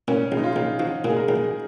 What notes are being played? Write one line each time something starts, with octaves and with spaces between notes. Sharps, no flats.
A#2 C#4
A#1
D#4
F4
A#1
F3 F#4
A#2 G#4
A#4
A#1